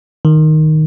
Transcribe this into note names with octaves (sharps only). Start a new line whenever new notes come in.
D#3